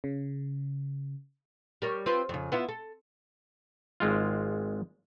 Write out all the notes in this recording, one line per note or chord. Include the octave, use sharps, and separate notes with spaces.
C#3
G3 A#4 C#5
C4 F4 B4
F2 C#3
B3 E4 F4
A4
G#1 G#3 F4